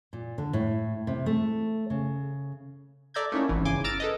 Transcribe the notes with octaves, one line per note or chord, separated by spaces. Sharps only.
A#2
D3
A2
C3
A3
C#3
A4 D5 E5 A#5 G6 G#6
A3 A#3 C#4 D#4 E4 C#5
G#1 E3
G1 C#3 G#5 C6 D6
A#5 E6 F6 A6 A#6 D7
A4 B4 D#5